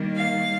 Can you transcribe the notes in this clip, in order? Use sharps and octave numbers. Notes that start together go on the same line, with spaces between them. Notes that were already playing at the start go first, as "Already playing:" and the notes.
Already playing: D#3 G3 A#3
F5